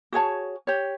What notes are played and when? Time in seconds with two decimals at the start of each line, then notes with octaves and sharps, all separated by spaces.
0.13 F#4 G#4 C#5 A5
0.67 G4 C#5